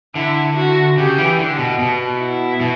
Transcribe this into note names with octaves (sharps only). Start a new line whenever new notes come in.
D3 E4
F#4
C#3 G4
E3
D3
B2
B2
E4
B2